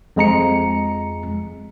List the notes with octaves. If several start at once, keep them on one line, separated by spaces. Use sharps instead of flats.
F2 G#3 A#5 C#7